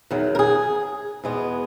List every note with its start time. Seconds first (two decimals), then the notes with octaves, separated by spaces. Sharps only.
0.11 E2 D#3 F#3
0.35 A#4
0.39 G#4
1.24 E2 B2 G#3 B3